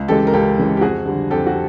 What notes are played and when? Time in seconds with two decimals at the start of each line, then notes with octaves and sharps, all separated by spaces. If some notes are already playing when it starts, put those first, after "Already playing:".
Already playing: C#2
0.08 C#3 E3 G#3 G4 A4
0.27 A#4
0.33 C#2 G4 A4
0.58 C#3 E3 G#3
0.77 G4
0.81 F2 F#4 G#4
1.06 D3 G3
1.30 F2 G4 A4
1.47 F#4